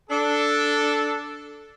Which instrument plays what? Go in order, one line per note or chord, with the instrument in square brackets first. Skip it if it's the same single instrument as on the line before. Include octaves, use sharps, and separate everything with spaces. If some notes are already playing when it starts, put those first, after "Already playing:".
[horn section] D4 A4